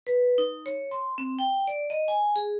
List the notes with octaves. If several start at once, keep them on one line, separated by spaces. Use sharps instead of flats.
B4
D#4
C#5
C6
C4
G5
D5
D#5
G#5
G#4